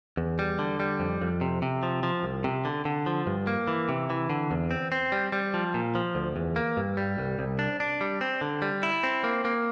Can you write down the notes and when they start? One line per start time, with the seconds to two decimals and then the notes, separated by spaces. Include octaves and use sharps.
0.17 E2
0.39 G3
0.59 D3
0.80 G3
1.00 F2
1.21 F2
1.41 C3
1.62 C3
1.83 F3
2.03 F3
2.23 C2
2.44 C3
2.65 D3
2.85 D3
3.06 F3
3.27 G2
3.47 A#3
3.68 E3
3.89 C3
4.10 E3
4.30 D3
4.51 E2
4.71 C4
4.92 C4
5.12 G3
5.32 G3
5.54 F3
5.74 A#2
5.95 F3
6.15 D2
6.36 E2
6.56 A#3
6.77 G2
6.97 G3
7.18 C2
7.39 C2
7.59 D4
7.80 D4
8.01 G3
8.21 C4
8.41 D3
8.62 G3
8.83 E4
9.03 C4
9.24 A#3
9.45 A#3